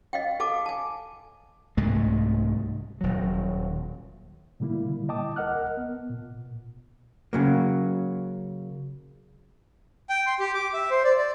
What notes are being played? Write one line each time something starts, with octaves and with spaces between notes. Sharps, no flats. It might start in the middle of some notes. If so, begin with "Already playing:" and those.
D#5 F5 G5
A4 F5 A5 D6
G#5 A5
C2 G#2 G#3 A3
D#1 F#3
A#2 D3 G3 A#3 E4
D#5 G5 A5 D6 D#6
C2 A#4 D#5 F#5 F6 F#6
B3
A#2
C#3 F#3 A#3
G5
C6
G4
D6
E5
C5
D5
D5